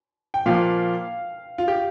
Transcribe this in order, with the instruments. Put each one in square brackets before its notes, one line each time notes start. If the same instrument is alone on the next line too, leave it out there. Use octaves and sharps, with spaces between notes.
[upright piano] G5
[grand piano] A#2 F3 A#3 [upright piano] F5
[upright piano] F4
G4